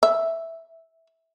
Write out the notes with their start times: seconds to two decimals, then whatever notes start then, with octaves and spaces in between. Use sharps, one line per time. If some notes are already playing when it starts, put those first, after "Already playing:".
0.03 E5